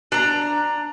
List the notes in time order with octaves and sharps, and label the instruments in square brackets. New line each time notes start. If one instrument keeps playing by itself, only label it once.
[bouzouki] D4 A#5